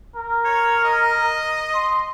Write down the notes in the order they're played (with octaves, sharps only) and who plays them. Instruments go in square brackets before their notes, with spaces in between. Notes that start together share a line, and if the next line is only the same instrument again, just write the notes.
[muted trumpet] A#4
[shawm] C#5
D#5
[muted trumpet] C6